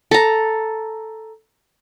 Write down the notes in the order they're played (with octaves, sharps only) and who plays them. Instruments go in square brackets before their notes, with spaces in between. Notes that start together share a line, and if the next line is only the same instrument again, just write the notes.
[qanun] A4 A#5